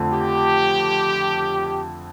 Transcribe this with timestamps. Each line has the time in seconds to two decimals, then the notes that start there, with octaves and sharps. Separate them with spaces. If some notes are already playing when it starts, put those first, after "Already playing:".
Already playing: F2 D3 A3
0.13 G4